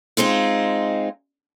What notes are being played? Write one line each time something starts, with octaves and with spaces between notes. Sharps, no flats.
G#3 C4 D#4 F4